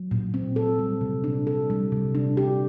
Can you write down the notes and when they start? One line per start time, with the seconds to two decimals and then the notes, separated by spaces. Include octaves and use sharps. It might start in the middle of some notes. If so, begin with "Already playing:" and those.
Already playing: F#3
0.11 A#2
0.34 C4
0.56 A4
0.79 G3
1.01 C3
1.24 D4
1.47 A4
1.70 G3
1.92 C3
2.15 D4
2.37 G4